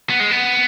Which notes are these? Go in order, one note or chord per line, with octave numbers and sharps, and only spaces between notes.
B3
G#3
B3